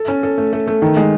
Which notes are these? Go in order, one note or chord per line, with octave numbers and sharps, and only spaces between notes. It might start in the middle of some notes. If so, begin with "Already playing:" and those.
Already playing: A4
C#4
A4
A3
A3
A3
D#3
G#3